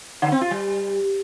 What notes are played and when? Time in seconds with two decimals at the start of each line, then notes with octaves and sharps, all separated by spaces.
0.22 D3
0.32 C4
0.41 F4
0.51 G3